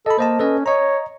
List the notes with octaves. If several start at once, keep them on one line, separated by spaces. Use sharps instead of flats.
A4 D#5 B5
A#3 C5 D#5 A5
C#4 A4 B4 D#5
C#5 D#5 A#5